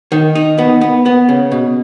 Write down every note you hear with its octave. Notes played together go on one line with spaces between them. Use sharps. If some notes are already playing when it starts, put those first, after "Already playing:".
D#3
D#4
B3
B3
B3
C#3
B2